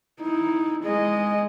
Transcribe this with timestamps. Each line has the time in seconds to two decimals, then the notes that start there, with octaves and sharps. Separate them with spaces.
0.21 D#4 E4
0.83 G#3 D#5